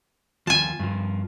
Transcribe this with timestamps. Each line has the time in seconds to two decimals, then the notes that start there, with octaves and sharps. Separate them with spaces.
0.47 D#2 F3 G#5 A5
0.79 G2 F3